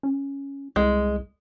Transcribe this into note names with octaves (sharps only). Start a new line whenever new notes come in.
C#4
C2 G#3